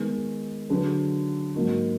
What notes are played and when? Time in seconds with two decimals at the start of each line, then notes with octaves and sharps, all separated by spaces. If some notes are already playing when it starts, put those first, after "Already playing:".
Already playing: D#3 G#3 B3
0.69 D3 F#3 D4 G#4 B4
1.54 G#2 F#3 A#3 D#4 F#4